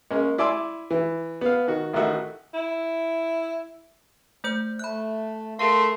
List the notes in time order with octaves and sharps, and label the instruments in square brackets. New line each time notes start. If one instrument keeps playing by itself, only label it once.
[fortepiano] G#3 A#3 C#4
E4 D5 G#5 C6 D6 E6
E3
B3 F5
D#3 F#4
A1 D#3 A3 D#4 F#4 E5
[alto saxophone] E4
[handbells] A3 C5 G6
[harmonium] A3 [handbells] B5 F#6
[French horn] A3 [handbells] G#4 A#4 F5 [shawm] C6